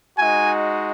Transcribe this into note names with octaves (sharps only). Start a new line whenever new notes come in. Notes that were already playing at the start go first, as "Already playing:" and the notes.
G#3 D#4 F#4 G#5